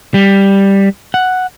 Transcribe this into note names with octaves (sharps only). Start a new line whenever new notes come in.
G3
F#5